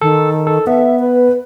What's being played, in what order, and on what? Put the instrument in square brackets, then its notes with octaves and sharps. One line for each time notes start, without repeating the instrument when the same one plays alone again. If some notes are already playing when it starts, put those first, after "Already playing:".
[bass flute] D#3 [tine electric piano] A4
[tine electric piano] A4
[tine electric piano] B3 [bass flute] E5
[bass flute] B4